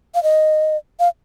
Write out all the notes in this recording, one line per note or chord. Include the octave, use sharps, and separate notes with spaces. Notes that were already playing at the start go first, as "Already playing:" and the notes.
F5
D#5
F5